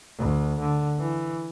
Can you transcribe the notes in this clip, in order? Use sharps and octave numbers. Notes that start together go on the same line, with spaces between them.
D2
D3
E3